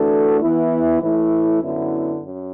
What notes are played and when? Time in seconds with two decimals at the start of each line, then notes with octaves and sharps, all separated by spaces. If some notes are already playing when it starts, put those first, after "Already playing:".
Already playing: E3 A3 D4 F#4 A4
0.40 E3 B3 E4
1.01 A2 E3 A3 E4
1.62 F#2 D3 B3 E4
2.22 F#2